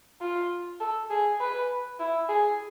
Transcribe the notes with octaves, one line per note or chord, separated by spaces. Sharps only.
F4
A4
G#4
B4
E4
G#4